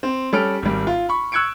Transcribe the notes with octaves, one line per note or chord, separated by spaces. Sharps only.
C4
G3 C#4 A4 F6 D7
G#1 G3
F4
B5 C#6
C#6 E6 F#6 G#6 C#7 D7